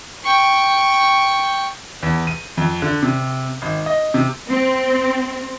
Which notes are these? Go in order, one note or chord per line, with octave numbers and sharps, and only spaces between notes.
G5 C#6
E2
D#7
F2
D3
C3
G#1
D#5
C3
C4